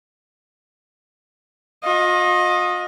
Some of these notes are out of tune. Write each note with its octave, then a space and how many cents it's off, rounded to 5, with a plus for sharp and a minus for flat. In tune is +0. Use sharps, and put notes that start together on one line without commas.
F4 +40 D#5 +0